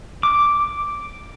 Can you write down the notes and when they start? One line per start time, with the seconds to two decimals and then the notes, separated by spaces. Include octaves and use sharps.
0.23 D6